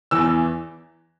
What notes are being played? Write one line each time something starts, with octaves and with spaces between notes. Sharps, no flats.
E2 E3 E6